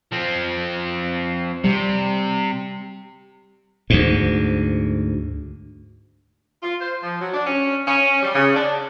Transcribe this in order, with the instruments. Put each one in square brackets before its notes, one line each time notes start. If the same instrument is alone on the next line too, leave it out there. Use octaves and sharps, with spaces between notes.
[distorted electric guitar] F3 C4
[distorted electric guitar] C3 [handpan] G3
[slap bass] D2 G#2
[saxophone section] F4
C5
F3
F#3
D4
C#4
C#4
G3
C#3
D4